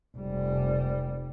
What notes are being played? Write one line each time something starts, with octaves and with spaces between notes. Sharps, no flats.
F1 G3